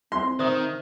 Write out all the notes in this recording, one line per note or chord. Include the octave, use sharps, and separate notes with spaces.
C4 C6
D#3 C5 E5 D#6